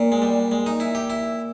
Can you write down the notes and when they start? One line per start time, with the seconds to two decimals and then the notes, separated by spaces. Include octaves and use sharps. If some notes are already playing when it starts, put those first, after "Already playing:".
Already playing: A#2
0.12 G#3
0.22 G3
0.52 G#3
0.66 D#4
0.80 E4
0.95 G4
1.10 E4